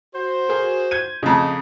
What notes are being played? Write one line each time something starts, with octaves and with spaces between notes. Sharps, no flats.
F#4 C5
G#4 A#4
G6 G#6 D#7
F2 C#3 D#5 A#5